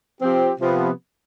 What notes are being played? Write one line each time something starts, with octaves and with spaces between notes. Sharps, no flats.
F3 C4 G4
C3 F3 B3